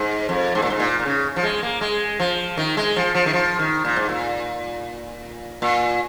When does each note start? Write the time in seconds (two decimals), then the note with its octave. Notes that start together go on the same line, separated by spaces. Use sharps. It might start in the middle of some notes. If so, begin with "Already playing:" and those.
Already playing: G#2
0.29 F2
0.55 G#2
0.62 A#2
0.70 G#2
0.80 A#2
0.99 A#2
1.06 C#3
1.36 F3
1.43 G#3
1.63 A#3
1.81 G#3
2.20 F3
2.57 D#3
2.77 G#3
2.96 F3
3.15 F3
3.26 D#3
3.33 F3
3.59 D#3
3.85 A#2
3.96 G#2
4.09 A#2
5.62 A#2